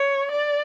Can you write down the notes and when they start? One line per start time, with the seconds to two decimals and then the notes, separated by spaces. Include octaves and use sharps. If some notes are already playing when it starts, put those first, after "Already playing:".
Already playing: C#5
0.31 D5